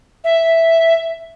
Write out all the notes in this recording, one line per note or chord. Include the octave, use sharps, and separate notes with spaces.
E5